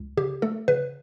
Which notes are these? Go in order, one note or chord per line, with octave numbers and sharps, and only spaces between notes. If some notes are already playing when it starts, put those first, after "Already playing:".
Already playing: C#2
C#3 G4
A3 A4
C#3 B4